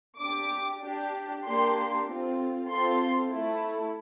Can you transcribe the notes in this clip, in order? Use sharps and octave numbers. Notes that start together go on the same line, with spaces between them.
D4 G4 D6
D4 G4
A#3 D4 G4 C6
C4 F4 A4
C4 F4 A4 C6
A3 E4 A4